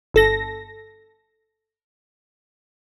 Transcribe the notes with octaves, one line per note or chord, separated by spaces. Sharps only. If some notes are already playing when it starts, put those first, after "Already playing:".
G1 A4 A#6